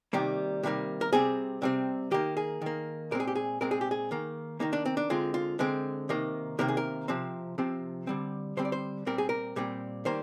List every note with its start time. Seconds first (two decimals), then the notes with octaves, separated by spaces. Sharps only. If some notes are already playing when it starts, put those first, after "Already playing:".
0.13 C3 D#3 G3 A#3 G4
0.63 C3 D#3 G3 A#3
1.01 A#4
1.13 C3 G3 C4 G#4
1.62 C3 G3 C4
2.11 D#3 A#3 G4
2.37 G#4
2.62 D#3 A#3
3.11 A#2 G#3 C4 A#4
3.20 G#4
3.27 G4
3.35 G#4
3.61 A#2 G#3 C4 A#4
3.71 G#4
3.81 G4
3.91 G#4
4.11 D#3 A#3
4.60 D#3 A#3 D#4
4.73 D4
4.85 C4
4.97 D4
5.10 D3 G#3 C4 F4
5.34 F4
5.59 D3 G#3 C4
6.09 C3 D#3 A#3
6.59 C3 D#3 A#3 A#4
6.68 G#4
6.77 A#4
7.08 C3 F3 C4
7.58 C3 F3 C4
8.07 D3 G3 C4
8.57 D3 G3 C4 C5
8.65 D5
8.72 C5
9.06 A#2 G3 C4 A#4
9.18 G#4
9.29 A#4
9.56 A#2 G3 C4
10.05 D#3 G3 A#3 C5